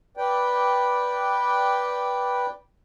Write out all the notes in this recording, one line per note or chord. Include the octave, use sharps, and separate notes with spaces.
B4 D5 G5